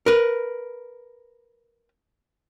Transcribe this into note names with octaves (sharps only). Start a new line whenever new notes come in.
A#4 B4